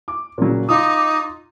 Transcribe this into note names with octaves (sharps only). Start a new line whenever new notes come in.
D6
A#2 C#3 F#3
D#4 F4 D6 D#6